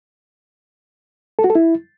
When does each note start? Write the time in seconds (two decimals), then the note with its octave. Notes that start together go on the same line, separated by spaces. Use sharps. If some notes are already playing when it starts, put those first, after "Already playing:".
1.39 A4
1.44 F#4
1.50 A4
1.55 E4